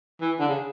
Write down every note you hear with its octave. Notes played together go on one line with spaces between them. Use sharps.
E3
D3
C#3